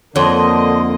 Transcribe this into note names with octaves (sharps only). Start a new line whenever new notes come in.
F2 D3 A#3 C#5 D#5 C6